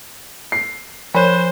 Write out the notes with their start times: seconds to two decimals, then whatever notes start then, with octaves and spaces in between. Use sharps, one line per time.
0.52 C7
1.15 F3 C5 C#5 B5